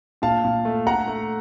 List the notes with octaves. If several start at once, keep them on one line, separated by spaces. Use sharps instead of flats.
A#2 F5 A5
A#2
A3
A3 F#5 A#5
A3